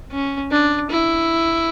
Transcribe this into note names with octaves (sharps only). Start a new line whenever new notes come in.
C#4
D4
E4